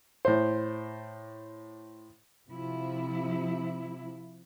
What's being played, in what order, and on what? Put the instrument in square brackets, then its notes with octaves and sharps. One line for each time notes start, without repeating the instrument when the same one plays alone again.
[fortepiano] A2 C5
[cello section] C3 F3 E4